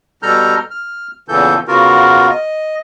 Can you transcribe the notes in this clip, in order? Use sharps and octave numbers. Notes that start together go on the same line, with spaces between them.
B2 G3 A4 A#5 F6 G6
F6
E2 A#2 C#3 E3 A4 G6
C#3 B3 F4 F#4 A#4
D#5